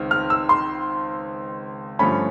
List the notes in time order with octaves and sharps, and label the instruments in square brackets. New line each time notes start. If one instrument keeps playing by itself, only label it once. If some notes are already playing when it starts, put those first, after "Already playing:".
Already playing: [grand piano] C#2 D#3 C4
[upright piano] F6
E6
C6
[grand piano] G2 D3 F3 A3 C#4 [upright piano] B5